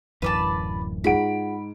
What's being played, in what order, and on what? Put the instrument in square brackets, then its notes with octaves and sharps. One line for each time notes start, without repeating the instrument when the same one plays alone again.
[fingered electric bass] D1 F#2 E3 [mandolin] B4 D5 A5
[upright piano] G#2 D7 [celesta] F4 G#4 F#5 [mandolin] B5